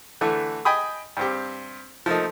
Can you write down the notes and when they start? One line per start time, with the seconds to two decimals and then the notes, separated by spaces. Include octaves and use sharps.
0.21 D3 E3 A3
0.65 D#5 G5 G#5 B5 D#6
1.17 G2 C4 G4
2.06 F3 A3 A#3 D#4